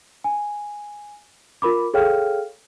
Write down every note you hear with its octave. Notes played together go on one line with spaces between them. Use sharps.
G#5
F4 A#4 B5 D6
G#4 A4 C#5 F5 G5 F6